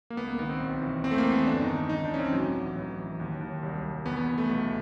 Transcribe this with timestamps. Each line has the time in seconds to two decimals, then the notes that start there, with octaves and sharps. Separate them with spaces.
0.10 A#3
0.17 C#2 B3
0.27 A#3
0.39 D#3 B3
0.49 C4
0.60 B1
0.82 E3
1.04 E2 C4
1.11 A3
1.18 A#3
1.25 E2
1.32 B3
1.47 G1 D4
1.61 D#4
1.68 D#3
1.89 C#2 D#4
2.05 D4
2.11 E3 C#4
2.19 C4
2.33 A1 F#3
2.55 E3
2.76 A1
2.98 E3
3.20 D#2
3.41 D#2
3.63 C2
3.84 C2
4.06 E2 B3
4.16 B3
4.27 E2
4.38 A3
4.49 B1